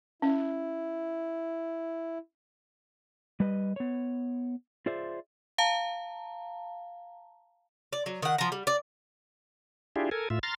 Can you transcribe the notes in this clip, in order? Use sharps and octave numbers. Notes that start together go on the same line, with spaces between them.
C#4 E4
G3 B4 D#5
B3 C#5
F4 G#4 C5 D5 E5
F5 A5 A#5
D5
F#3
D#3 F#5
F3 A#5
G3
D5
D4 E4 F4 G4 G#4
A4 A#4 G#5
A2 F4 E5
A#5 C6 F6 A6